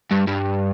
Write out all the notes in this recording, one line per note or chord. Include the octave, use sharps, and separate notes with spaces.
G2
G2